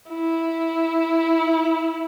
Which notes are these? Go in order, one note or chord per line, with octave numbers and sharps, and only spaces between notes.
E4